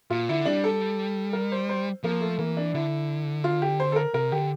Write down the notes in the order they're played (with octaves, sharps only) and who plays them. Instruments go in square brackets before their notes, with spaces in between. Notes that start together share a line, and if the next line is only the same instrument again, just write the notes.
[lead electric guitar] A#2 [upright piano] F4
[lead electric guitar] D3 [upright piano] E4
[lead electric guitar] G3 [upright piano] D4
[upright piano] A4
A#4
C5
C5
[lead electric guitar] F3 [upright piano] A#3
[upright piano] A3
[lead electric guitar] E3 [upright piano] A#3
[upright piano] D4
[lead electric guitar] D3 [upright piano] E4
[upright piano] F4
G4
C5
A4
A#4
[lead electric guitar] C3 [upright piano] A#4
[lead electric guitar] D3 [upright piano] G4